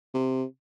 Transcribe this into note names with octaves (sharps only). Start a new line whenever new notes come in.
C3